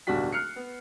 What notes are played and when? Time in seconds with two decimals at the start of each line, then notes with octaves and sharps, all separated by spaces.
0.07 D1 B1 G3 D4 F#4 B6
0.33 F6 F#6 C7 C#7
0.56 B3